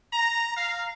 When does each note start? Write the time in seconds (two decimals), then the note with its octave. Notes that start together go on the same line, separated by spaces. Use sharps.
0.13 A#5
0.57 F5